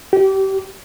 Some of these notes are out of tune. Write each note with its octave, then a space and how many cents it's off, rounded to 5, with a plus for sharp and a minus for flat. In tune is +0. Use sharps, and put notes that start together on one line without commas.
G4 -30